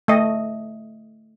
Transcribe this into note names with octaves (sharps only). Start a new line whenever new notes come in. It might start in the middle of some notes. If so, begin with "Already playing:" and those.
A3 D#5